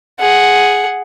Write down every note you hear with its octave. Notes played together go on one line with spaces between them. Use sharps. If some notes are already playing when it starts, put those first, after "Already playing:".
G#4 F#5